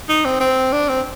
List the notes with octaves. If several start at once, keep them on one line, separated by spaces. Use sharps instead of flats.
D#4
C4
C4
D4
C4